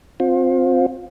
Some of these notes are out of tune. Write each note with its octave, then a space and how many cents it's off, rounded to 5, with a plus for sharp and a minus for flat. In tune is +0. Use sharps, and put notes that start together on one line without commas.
C4 +0 F4 +25